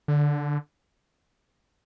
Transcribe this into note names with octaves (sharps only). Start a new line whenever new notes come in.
D3